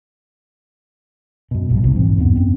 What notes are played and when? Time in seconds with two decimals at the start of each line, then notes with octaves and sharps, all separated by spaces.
1.51 F#2 B2
1.69 A#1 G2 B2
1.83 G1 C2 C3
1.95 G#2 E3 C4
2.18 E2 G2 A#3 B3
2.35 F#2 C4